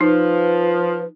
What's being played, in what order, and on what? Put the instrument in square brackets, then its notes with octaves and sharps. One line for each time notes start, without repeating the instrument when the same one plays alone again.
[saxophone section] F3 [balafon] D#4 [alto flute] B4